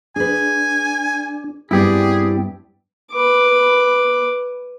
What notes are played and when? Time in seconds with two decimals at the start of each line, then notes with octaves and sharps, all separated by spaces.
0.16 D4 G#4 B4 G#5
1.71 G2 G3 B3 C4 E4 G4 G#4 D5
3.12 B4 D6